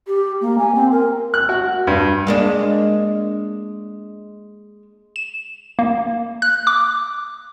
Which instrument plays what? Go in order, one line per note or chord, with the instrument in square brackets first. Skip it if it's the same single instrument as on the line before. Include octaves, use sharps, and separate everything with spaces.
[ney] G4
A#3
G#5
C4
A#4
[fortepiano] F#6
F#4
G2
[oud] G#3 A#3 D4
[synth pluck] E7
A#3
F#6
D6